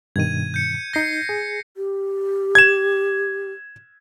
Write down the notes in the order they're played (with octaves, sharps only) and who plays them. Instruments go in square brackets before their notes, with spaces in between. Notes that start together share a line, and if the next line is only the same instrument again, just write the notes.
[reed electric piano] G2 B2 D#3 [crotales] G#6 D#7
[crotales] G6 C#7
[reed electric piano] D#4 G6 [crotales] A#6 C7 C#7
[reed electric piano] G#4
[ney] G4
[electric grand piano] G#6 E7